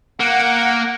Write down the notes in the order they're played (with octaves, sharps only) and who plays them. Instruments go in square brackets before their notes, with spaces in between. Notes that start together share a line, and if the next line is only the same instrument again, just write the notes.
[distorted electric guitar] A#3 [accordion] F#5